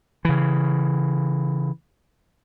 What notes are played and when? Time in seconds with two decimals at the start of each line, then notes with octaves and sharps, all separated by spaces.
0.25 C#3 E3